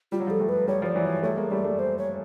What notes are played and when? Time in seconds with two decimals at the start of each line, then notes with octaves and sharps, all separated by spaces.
0.12 G3 F4
0.20 F#3
0.27 F3 G3 A4
0.40 G3 A3
0.49 B4
0.67 G3 A3 C#5
0.82 F3 G3 D5
0.96 E3 F#3
1.05 C#5
1.23 G3 A3 C#5
1.37 G#3 A#3
1.51 G3 A3 D5
1.64 G3 A3
1.79 C5
1.98 C#5